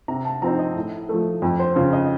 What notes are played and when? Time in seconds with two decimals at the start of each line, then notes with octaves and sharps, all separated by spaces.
0.08 C3 A#5
0.25 A5
0.42 F3 C4 D#4 A#5
0.59 D#5
0.76 A2
1.09 F3 A3
1.42 F2
1.60 C5
1.76 C#3 F3 C5
1.93 D#5